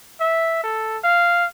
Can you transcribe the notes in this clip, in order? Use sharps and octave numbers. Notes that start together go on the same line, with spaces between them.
E5
A4
F5